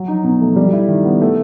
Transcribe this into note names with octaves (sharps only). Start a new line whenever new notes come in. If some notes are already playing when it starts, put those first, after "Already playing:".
Already playing: F#3
D#4
B2
A3
G3
E4
D#3
B3
A3